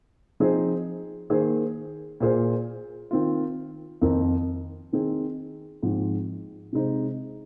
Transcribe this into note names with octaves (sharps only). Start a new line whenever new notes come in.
F3 C4 D#4 G#4 C5
D#3 A#3 G#4 C5
A#2 A#3 F4 G#4 C5
D#3 C4 F4
F2 D#3 C4 D#4 A#4
D#3 C4 D#4 G#4
G#2 F3 C4
C3 G#3 D#4 C5